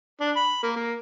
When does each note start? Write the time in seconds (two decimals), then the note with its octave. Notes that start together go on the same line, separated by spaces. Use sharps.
0.21 D4
0.36 B5
0.63 A#3
0.76 A#3